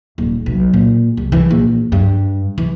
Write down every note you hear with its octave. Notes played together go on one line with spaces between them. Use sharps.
D#1
B1
A#2
C2
E3
A#1
G2
E3